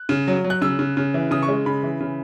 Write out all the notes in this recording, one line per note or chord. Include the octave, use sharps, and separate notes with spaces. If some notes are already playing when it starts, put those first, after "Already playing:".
Already playing: F#6
C#3
F#3
F#3
F#6
C#3 E6
C#3
C#3
E3
C#3 D#6
C#6
G#3
C#3 B5
E3
C#3